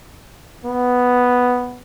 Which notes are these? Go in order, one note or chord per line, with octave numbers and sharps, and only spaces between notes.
B3